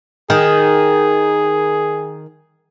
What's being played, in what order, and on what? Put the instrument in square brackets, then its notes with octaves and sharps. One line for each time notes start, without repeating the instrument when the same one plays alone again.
[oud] D#3 [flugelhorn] G#4